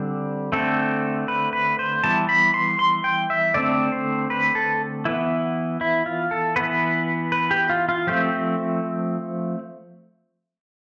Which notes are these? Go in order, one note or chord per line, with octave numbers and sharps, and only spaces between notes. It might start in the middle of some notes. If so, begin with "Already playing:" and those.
Already playing: D3 G3 C4 C5
D3 A3 C4 A4
B4
B4
C5
E3 G3 B3 A5
B5
C6
C6
G5
E5
D3 A3 C4 D5
C5
B4
A4
E3 B3 E4
E4
F4
A4
E3 B3 B4
B4
G4
F4
F4
F3 A3 C4 G4